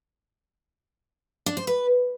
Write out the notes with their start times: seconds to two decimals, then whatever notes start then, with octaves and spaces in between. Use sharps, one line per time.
1.46 D4
1.57 C5
1.67 B4